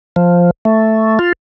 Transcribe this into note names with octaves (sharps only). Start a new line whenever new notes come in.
F3
A3
F4